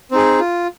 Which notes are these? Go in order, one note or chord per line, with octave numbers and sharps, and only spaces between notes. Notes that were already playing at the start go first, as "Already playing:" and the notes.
C4 D#4 G#4
F4